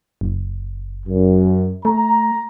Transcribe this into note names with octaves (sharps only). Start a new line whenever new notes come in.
F#1
F#2
A3 A#5